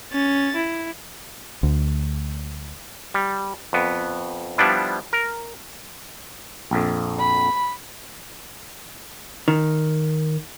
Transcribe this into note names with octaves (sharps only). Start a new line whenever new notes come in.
C#4 A6
E4
D2
G3
F2 B3
F3 G3 B3 D4 E4
A#4
A#1 F2
B5
D#3